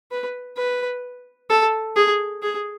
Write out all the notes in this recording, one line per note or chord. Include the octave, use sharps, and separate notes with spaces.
B4
B4
A4
G#4
G#4